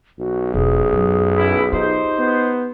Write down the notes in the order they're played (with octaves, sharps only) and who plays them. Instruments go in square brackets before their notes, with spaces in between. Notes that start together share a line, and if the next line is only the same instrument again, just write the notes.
[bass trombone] B1 [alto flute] F#4
[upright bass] E1 [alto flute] G#4
[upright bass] F#2
[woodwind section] B3 C#4 E4
[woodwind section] D#4 G4 C5 [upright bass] F4
[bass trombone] B3